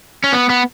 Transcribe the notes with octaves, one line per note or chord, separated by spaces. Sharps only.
C#4
B3
B3